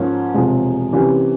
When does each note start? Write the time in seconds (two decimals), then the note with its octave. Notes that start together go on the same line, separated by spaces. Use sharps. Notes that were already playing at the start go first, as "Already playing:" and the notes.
Already playing: G#2 F3 A#3 C#4
0.34 E1 E2 C3 F3 G#3
0.93 C3 E3 A#3 C#4 G4